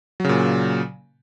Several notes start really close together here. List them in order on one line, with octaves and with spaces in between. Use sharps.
F#3 C#3 A#2